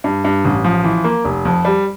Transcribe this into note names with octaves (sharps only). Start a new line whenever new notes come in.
G2
G2
A1
F3
E3
A#3
F1
F2
G3